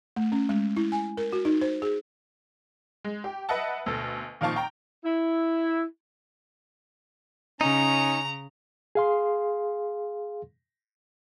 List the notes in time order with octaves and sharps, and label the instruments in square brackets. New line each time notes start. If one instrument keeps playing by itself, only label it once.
[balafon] A3
C#4
G#3
E4
G#5
A#4
F#4
D#4
C5
G#4
[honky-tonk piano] G#3
G4
B4 D#5 E5 F#5 A5
D2 B2 A4
A#2 D#3 F3 F5 A5 C#6
G5 A#5
[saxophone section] E4
[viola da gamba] C#3 [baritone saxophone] C#4 [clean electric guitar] D#4 [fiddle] A#5
[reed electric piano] G#4 F5 C6